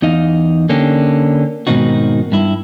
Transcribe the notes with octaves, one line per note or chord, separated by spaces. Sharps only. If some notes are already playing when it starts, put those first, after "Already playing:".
E2 D#4 D#5 F5
D3 A#3 C#4 D4 G4
G#2 B2 D#3 C4 D#4 F#4
G2 E4